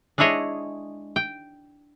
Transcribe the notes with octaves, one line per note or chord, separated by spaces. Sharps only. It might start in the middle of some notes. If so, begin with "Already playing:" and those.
G#3 D4 E4 G#4 C#5 D#5
G5